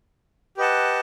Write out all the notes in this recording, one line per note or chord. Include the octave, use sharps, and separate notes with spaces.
G4 B4 D#5 F#5 A5